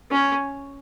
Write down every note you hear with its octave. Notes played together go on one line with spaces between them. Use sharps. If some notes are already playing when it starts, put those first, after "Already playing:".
C#4